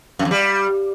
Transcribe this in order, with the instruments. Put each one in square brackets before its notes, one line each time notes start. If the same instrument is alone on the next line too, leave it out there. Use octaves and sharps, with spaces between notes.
[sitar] F#2
F2
G3